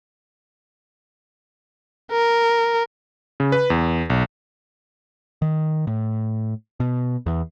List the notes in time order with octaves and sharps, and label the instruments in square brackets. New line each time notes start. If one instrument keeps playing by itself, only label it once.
[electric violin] A#4
[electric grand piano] C#3
B4
E2
B1
[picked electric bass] D#3
A2
B2
E2